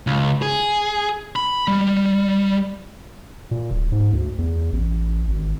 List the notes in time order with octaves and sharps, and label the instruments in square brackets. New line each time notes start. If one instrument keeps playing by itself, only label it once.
[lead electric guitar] C#2
G#4
B5
G3
[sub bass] A#2
D1
G#2
D2
E2
A1
G#1